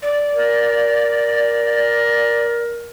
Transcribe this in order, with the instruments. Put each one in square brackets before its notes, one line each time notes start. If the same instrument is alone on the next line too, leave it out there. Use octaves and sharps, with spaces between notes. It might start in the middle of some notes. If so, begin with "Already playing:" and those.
[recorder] D5
[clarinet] A#4